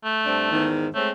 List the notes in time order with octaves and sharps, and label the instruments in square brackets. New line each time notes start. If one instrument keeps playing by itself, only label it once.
[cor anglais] A3
[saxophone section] G2 C4 D4
E2 G#2 D#3
[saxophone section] G#3 C4 C#5 [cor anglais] A3